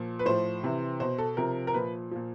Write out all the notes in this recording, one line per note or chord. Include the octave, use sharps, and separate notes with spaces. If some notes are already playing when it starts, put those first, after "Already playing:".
Already playing: A#2 F3
B4
A2 F3 C5
C3 E3
B2 C5
A4
C3 F3 A#4
A#4
A#2 F3 B4
A#2 F3